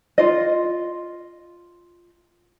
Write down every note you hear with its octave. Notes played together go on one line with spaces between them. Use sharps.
F4 D#5